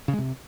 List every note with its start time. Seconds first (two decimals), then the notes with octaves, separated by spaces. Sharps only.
0.08 C#3
0.13 G#3
0.19 C3